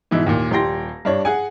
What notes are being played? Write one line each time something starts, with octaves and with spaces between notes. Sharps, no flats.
G#2 B2 E3 E4
D#2 A#2
D#1 G3 G5 C6 A#6
G2 D4 C#5
G#4 F#5 G#5